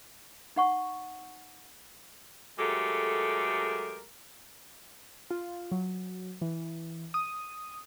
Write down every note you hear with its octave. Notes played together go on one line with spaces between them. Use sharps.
D#4 F#5 C#6
F#3 G#3 A3 G4 A4 A#4
F4
F#3
E3
D#6